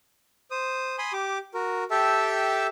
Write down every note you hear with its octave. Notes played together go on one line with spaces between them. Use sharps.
C5 D#6
G#5 B5 C6 D#6
G4 D6
F#4 A#4
G4 A4 E5 G5 A5 E6